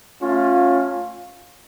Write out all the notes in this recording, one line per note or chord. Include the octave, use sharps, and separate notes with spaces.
A3 C#4 F4